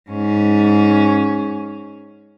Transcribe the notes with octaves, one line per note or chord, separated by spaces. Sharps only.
G#2 C#4